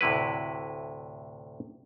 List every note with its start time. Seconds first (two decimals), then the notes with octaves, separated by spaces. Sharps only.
0.01 D2 A2 C3 E4 B4